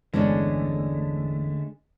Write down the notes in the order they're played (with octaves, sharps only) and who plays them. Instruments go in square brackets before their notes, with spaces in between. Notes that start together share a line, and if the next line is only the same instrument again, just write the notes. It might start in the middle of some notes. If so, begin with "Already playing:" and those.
[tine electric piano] G1 E2 E3 [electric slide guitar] D3 A3 [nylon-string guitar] G#3 C#4 D4